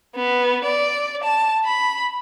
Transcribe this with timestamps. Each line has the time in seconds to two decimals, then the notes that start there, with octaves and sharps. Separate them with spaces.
0.15 B3
0.65 D5
1.24 A5
1.65 B5